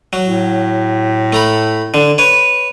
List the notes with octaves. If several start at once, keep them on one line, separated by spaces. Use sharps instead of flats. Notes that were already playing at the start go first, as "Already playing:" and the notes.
F#3
A2
A3 A#5 B5
D3
B4 C#5